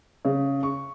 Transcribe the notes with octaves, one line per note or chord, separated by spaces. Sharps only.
C#3
C#6